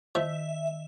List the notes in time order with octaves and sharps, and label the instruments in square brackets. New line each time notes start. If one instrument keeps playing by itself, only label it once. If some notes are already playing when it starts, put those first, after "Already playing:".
[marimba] D#3 [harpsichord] F3 [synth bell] E5